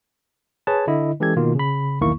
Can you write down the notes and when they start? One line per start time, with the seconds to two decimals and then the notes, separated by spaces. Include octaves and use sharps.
0.67 G#4 B4 C#5 A5
0.87 D3 E4 D#5
1.20 E3 G#3 C#4 G4 A4 G#6
1.36 B2 D#3 A#3 F4
1.55 C#3 B5
2.01 B1 E2 D#3 A#3 E4 C#6